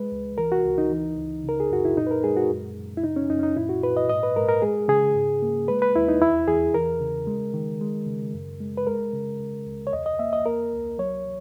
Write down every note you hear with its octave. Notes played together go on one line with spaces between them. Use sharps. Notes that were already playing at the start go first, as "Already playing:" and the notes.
Already playing: G#3 B4
C#2
E3 A#4
F#4
C#2
D#4
E3
C#2
C#3 A#4
G#4
F#2 F#4
E4
A#2 D#4
B4
A#4
G#3 G#4
F#4
F#2
F#2
E4
C#3 D#4
C#4
F#2 D#4
C#4
D#4
A#2 E4
F#4
A#2 B4
D#5
G#2 D#5
B4
G#2 A#4
A#4
G#3 G#4
C#3 G#4
G#2
A#3
G#3 B4
B4
D#2 E4
D#4
E2 E4
E2 G#4
E3 A#4
C#3
G#3
D#3
G#3
C#3
F#2
G#3
B4
G#3 A#4
C#3
C#3
C#2
C#5
E2 D#5
D#5
A#3 E5
D#5
A#3 A#4
C#2
F#3 C#5